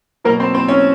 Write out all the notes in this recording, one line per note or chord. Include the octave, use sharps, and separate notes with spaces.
B2 F#3 A#3 A#4
C4 C5
C4 C5
C#4 C#5